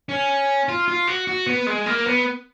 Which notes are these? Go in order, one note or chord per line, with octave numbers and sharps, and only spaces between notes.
C#4
F4
F4
F#4
F#4
B3
G#3
A#3
B3